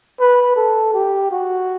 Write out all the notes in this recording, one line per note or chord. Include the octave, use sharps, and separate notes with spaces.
B4
A4
G4
F#4